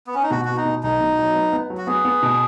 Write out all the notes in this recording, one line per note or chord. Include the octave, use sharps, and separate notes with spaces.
B3
C#4
D#4
B2 F#4
B3 F#4
D#4
B2
B1 D#4
B2
F#3
B3
B3
F#3
F#4
B3 G#4
B3
B2